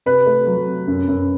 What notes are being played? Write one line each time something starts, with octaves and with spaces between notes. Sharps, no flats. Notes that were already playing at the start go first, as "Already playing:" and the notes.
C3 B4
A3
F#3
C3
F#2
F#2